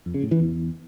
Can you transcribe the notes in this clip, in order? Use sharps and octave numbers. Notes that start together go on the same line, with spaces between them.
F2
C#3
A2
E3
E2